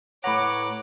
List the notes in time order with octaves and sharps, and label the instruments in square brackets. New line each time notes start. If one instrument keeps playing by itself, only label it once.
[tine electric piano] A2 B4 A#5 [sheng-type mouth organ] C#5 F#6 [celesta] F#5 B5 [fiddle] D6